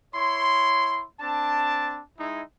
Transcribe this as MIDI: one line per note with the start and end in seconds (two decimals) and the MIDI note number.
0.15 1.04 64
0.15 1.04 73
0.15 1.04 84
1.20 2.01 60
1.20 2.01 62
1.20 2.01 81
2.18 2.41 56
2.18 2.41 63
2.18 2.41 64
2.18 2.41 76